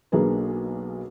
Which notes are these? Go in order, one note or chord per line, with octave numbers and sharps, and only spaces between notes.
B1 A#3 D4 G#4 B4